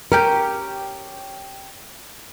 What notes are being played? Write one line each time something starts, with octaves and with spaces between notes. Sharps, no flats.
C#4 G4 A#4 G6